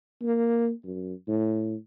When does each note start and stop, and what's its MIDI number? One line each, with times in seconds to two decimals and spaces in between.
0.22 0.72 58
0.84 1.14 42
1.28 1.75 45